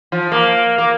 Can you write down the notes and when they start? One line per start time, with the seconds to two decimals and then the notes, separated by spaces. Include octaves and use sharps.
0.12 F3
0.32 A#3
0.78 A#3